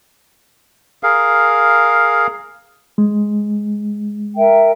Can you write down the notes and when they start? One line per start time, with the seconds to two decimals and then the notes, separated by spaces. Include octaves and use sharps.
1.03 G#4 A#4 F5
2.98 G#3
4.36 A#4 E5 G5